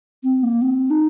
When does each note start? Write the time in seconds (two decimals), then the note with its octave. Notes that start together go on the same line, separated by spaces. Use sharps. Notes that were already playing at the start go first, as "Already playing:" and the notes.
0.24 C4
0.43 A#3
0.62 C4
0.90 D#4